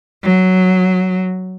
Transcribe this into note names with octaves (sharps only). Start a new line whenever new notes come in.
F#3